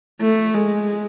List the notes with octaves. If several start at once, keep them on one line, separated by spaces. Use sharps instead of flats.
A3
G#3